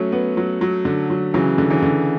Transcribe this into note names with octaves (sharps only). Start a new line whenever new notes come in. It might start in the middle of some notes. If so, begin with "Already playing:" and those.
Already playing: F#3 A3 C#4
B3
F#3
F#3
D3
F#3
C#3 E3 F#3
D3
C#3 E3
D3